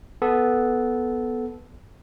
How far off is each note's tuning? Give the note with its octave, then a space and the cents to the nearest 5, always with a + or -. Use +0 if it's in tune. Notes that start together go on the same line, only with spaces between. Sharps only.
B3 +0 A4 -15